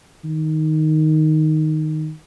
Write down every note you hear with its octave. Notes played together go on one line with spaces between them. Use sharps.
D#3